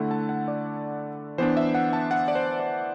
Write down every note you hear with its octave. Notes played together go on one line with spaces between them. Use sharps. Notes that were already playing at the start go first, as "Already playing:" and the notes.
Already playing: D3 A3 E4 F#5
A5
F#5
D5
E3 B3 D4 C5
E5
F#5
A5
F#5
D5
C5
D5